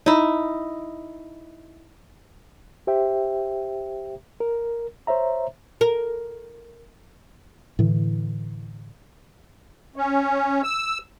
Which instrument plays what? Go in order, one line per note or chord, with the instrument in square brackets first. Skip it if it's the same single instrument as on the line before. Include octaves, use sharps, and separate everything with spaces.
[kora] D#4 E4
[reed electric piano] G4 C5 E5 G5
A#4
C5 C#5 E5 A#5
[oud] A#4
[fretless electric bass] A2 D3 E3
[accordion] C#4
E6